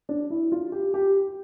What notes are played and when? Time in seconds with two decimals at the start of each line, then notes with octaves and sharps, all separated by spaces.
0.09 D4
0.30 E4
0.52 F4
0.72 G4
0.94 G4